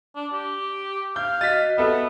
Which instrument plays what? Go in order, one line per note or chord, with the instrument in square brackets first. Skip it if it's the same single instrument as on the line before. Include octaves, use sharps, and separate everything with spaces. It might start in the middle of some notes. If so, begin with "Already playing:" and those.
[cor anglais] D4
G4
[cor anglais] F5 [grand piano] G6
[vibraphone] F#4 D#5 [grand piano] A6 B6
[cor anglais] B3 [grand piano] A4 E5